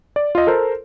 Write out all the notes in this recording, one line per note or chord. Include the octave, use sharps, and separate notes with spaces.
D5
F4 D#5
A4 A#4 C5